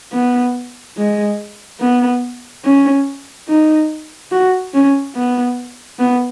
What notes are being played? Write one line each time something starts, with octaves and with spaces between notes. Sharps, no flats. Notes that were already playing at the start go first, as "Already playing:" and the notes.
B3
G#3
B3
C#4
D#4
F#4
C#4
B3
B3